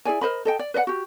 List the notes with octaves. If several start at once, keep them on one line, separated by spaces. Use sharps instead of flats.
E4 G#4 D5 G#5
A#4 C5 D#5 B5
A4 D#5 G5
D5
B4 D5 D#5 F#5
F#4 G4